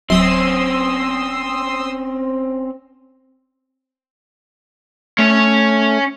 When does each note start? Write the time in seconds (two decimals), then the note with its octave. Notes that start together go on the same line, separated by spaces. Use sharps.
0.10 D1 F#3 C4 C#4 C6 D#6 E6
5.18 A3 C#4 C#5